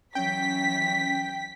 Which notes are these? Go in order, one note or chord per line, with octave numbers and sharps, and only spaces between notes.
E3 F#3 C#4 G5 B6